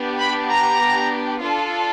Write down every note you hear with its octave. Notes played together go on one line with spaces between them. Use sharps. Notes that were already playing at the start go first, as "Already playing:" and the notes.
Already playing: B3 D4 G4
B5
A#5
D4 F4 A4